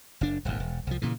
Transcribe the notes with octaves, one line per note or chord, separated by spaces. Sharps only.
F#1 D4
D#1 G#1 D#2
E1
C2 F3
A#2 C#3 E3